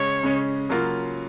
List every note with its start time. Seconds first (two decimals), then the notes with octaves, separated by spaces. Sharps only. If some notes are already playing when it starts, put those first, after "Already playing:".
Already playing: C#3 G#3 C#4 C#5
0.23 C#3 G#3 C#4
0.69 C#3 F#3 A#3 F4